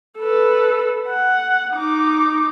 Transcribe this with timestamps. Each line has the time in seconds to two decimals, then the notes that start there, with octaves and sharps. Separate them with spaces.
0.19 A4 B4
1.09 F#5
1.75 D#4 D6